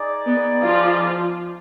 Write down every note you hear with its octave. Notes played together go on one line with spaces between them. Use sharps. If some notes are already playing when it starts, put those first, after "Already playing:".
Already playing: D#4 G#4 D5
B3
F3 F4